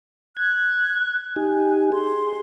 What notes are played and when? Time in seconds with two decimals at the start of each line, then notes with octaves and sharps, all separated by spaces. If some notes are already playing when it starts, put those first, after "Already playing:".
0.37 F#6 G#6
1.36 D#4 G4 G#5
1.92 G#4 C6